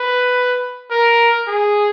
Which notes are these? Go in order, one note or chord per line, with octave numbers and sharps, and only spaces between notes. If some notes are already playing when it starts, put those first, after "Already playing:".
Already playing: B4
A#4
G#4